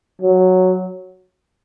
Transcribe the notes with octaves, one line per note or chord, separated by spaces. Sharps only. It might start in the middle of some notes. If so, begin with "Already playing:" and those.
F#3